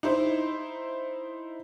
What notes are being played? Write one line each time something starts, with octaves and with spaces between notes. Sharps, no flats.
D#4 E4 C5